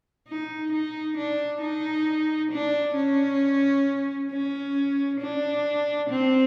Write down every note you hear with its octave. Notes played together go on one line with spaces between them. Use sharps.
D#4
D#4
D4
D#4
D4
C#4
C#4
D4
C4